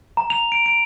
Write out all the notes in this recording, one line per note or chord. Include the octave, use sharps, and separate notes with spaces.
A#5
F7
D7
D7